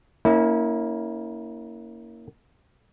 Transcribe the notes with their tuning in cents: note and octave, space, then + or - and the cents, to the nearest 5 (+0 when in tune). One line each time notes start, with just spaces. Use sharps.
A#3 +0 C#4 +10 E4 -35